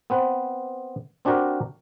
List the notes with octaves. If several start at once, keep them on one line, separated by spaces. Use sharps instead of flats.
B3 C4 B4
C4 D4 F#4 G4 A#4